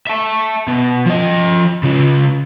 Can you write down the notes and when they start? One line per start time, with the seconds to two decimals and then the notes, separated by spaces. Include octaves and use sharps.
0.07 E5 A5
0.68 B2
1.06 F3 D#5
1.83 C#3 F4